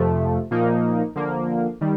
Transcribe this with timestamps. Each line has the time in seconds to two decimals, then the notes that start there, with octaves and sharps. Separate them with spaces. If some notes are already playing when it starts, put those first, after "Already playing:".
Already playing: F2 C3 F3 A3
0.51 A#2 F3 A#3 D#4
1.16 D3 F3 A#3
1.81 D#3 G3